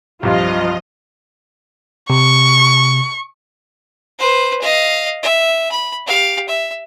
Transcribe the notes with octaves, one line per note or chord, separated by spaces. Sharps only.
C2 G2 F3 F4 D#5
C3 C#6
B4 C5
D#5 F5
E5
B5
G4 F5
E5